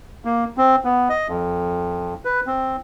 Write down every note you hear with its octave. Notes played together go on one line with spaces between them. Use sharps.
A#3
C4
B3
D#5
F2
B4
C4